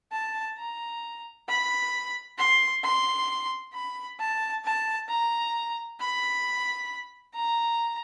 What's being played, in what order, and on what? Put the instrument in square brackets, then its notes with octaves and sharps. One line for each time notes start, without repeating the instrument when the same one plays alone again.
[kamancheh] A5
A#5
B5
C6
C6
B5
A5
A5
A#5
B5
A#5